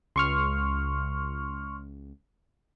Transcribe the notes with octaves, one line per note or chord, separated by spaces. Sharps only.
C#2 C6 C#6 F6